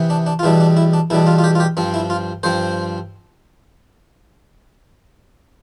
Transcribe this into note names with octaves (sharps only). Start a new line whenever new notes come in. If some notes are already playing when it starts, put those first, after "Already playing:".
Already playing: C3 E3 B3
D4
D4
F4
E2 B2 G3 D4 E4
D4
E4
D4
E2 B2 G3 D4 E4
F4
F4
G4
F4
G4
G2 F3 C4
E4
F4
G2 F3 C4 C5